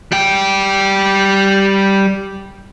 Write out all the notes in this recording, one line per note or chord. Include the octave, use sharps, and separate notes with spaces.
G3 G5